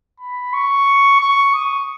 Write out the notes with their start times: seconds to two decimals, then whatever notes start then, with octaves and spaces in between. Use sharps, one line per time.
0.20 B5
0.53 C#6
1.20 C#6
1.54 D#6